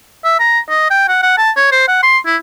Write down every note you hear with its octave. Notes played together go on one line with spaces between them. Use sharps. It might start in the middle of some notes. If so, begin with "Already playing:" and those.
E5
A#5
D#5
G5
F#5
F#5
A5
C#5
C5
F#5
C6
E4